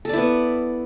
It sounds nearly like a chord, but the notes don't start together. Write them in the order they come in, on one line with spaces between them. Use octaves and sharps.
A4 D5 E4 B3